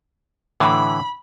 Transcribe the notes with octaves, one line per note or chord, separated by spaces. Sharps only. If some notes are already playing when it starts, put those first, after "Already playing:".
A2 D3 E3 B5